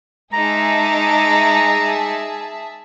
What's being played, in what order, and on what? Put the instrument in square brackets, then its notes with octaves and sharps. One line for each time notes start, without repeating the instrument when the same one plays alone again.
[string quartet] G#3 D#4 D6 [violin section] G#4 E5 A5 [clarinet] A#5